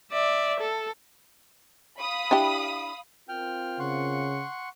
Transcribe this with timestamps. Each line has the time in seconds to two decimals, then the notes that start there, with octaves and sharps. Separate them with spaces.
0.11 D5 E5
0.60 A4
1.99 F5 B5 D#6
2.31 D4 E4 G4
3.29 C4 F4 A#4 G5 F6
3.79 C#3 F#5 C6 C#6